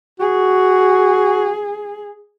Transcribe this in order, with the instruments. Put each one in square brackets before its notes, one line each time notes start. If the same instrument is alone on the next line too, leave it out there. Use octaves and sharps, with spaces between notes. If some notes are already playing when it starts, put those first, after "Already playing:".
[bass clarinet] F#4 [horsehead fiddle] G#4